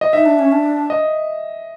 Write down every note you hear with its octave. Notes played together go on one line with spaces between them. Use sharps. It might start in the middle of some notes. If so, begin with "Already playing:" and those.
D#5
D#4 E5
D4
C#4
D4
D#5